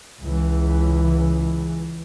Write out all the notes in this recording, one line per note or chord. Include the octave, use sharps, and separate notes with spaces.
C#2 E3